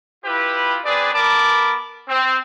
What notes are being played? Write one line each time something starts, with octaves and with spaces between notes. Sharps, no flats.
E4 F4 G4 B4
C4 D4 G#4 B4 D5
B3 A#4 A5 B5 D6
C4